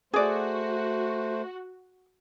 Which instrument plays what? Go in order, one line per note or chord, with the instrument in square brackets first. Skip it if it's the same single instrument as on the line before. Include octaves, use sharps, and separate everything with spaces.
[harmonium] A3 C5 [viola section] F#4 [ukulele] G#4 D5